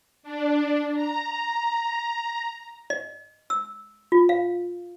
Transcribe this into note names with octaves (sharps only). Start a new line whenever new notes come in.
D4
A#5
D#5
E6
F4
F5